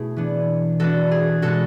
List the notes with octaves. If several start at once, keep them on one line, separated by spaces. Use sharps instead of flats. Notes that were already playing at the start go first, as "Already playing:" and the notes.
Already playing: B2 A3 E4 G#4
E3 B3 D4
E3 B3 D4 F#4 A4
G#4
B2 G#3 B3 F#4 A4